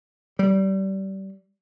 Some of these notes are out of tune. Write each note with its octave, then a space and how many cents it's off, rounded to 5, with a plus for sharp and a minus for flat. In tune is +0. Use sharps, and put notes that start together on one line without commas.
G3 -25